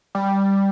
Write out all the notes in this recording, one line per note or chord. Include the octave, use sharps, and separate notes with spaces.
G3